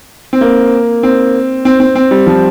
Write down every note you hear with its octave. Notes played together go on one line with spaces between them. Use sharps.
C4
A#3
C4
C4
C4
C4
G3
F3